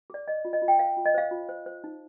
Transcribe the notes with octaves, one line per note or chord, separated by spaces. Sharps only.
G#4 D5
C5 D#5
F4
D#5
F4
G5
C5 F5
F4
D#5
C5 F5
F4
C5
C5
D#4